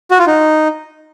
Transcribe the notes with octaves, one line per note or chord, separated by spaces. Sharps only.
F#4
F4
D#4